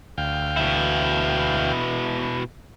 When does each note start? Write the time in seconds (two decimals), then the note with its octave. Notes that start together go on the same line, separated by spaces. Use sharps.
0.18 D2 F5 G5
0.57 B2 E4